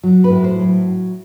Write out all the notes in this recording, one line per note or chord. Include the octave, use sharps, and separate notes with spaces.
F#3
B4
A2
C5
F#3